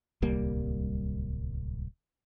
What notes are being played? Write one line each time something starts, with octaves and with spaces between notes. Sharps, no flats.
D1 C2 G3 A#3